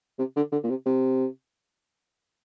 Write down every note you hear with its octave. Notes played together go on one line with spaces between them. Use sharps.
C3
D3
D3
A#2
C3
C3